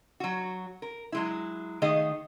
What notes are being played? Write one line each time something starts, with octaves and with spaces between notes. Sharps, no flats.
F#3 F#4
A#4
F#3 G#3 E4
D#3 A3 G#4 D#5 F5